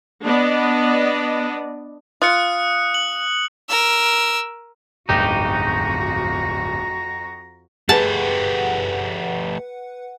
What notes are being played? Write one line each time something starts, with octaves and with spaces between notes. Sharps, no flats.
B3 D4 D5 D#5
F4 D#6 F#6 C#7
F#7
A#4 E6
D1 G1 F2 D#4 F#4 G4 A#5
A3 G4 G#4 B4 F#5 A5